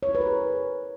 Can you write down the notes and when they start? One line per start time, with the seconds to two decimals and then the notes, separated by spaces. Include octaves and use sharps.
0.03 C#5
0.09 E4
0.15 B4
0.21 A#4
0.27 G#4